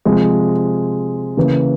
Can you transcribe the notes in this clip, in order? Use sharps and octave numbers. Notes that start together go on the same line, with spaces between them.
C3 F3 G#3
C#3 E3 A#3